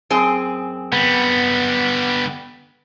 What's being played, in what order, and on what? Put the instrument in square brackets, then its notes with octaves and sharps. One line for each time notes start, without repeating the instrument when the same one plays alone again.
[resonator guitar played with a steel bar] F#2 C4 G#4
[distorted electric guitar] D3 G3 [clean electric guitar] B3